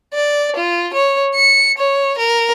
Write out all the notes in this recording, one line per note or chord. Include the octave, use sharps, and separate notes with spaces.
D5
F4
C#5
C#7
C#5
A#4